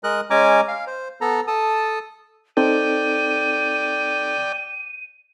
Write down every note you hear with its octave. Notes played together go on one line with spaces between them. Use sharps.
G#3 A#4 D#5 F#6
G#3 C#4 G#5 A#5 D6
F5
C5
B3 A4 A#5
A4 A5 D#6
C4 D#4 A4 D5 G5 D#7